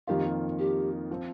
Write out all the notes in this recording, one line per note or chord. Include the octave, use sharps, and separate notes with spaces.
F2 D#3 A#3 F4 G4
G4
F3 C4